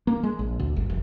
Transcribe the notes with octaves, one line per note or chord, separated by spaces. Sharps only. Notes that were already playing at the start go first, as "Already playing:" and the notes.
A#3
G#3
A#1
D2
G1
F1